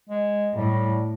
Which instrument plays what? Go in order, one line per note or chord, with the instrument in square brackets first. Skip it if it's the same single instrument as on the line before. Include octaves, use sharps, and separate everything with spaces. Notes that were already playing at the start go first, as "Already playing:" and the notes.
[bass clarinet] G#3
[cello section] A2 [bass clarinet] G3